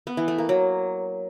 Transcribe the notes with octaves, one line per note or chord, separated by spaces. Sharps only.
B3
E3
A3
A#3
F#3